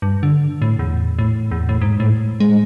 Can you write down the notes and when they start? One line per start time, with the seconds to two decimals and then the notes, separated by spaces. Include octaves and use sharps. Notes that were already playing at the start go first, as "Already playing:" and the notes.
0.02 G2
0.23 D3
0.62 A2
0.79 E2
1.19 A2
1.51 E2
1.69 A2
1.81 G#2
2.00 A2
2.40 G#3